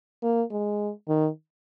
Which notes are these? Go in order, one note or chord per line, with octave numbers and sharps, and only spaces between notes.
A#3
G#3
D#3